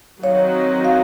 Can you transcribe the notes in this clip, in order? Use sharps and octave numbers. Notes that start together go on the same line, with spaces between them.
D#3 F#3 C4 D#4 F#4 C#5 F5
F5